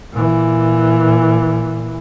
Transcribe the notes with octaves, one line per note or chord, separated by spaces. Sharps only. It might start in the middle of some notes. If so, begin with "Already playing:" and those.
A#2 E3